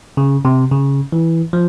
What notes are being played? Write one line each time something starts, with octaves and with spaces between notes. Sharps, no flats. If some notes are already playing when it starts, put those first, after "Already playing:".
C#3
C3
C#3
E3
F3